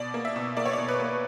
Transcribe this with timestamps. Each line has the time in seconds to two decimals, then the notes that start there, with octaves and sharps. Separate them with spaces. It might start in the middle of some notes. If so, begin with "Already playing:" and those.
Already playing: B2 D5
0.14 A#3
0.25 E5
0.36 B2
0.57 A#3 D5
0.66 C#5
0.73 B2 D5
0.88 B4
1.00 A#3